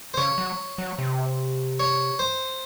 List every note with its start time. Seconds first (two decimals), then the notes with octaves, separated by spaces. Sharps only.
0.14 C5
0.17 C#3 C#5
0.38 F#3
0.78 F#3
0.99 C3
1.79 C#5
2.19 C5